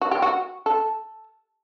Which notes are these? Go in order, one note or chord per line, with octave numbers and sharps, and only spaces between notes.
F#4
G4
F#4
A4